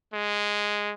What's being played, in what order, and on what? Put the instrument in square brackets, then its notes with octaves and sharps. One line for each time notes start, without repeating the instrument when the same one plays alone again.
[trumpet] G#3